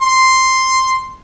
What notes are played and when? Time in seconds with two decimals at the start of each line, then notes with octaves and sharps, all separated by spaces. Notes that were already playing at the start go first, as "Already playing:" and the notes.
0.02 C6